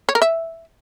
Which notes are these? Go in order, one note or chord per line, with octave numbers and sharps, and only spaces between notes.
C#5
A#4
E5